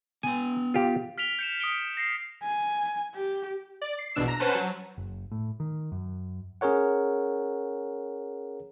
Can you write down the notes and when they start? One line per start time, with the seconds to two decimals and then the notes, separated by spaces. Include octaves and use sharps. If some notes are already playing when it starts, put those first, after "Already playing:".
0.23 B3 G5 G#5
0.74 F4 G4
1.18 F6 B6 D7 F7 G7
1.39 G6 C#7 E7
1.60 D#6 C#7 D7 G7
1.97 A#6 C7 C#7
2.43 G#5
3.15 G4
3.82 D5
3.99 C7
4.15 A#1 E2 B2 D4 E6 E7
4.28 A#5 A#6
4.39 C#4 B4 C5 F#5 A5
4.55 F#3
4.98 F#1
5.32 A2
5.60 D#3
5.92 F#2
6.61 C#4 G#4 A#4 C#5 F#5